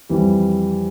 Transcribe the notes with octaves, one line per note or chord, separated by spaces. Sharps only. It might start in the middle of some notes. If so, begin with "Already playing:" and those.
F2 E3 G3